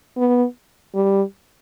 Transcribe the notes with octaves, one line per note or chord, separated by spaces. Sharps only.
B3
G3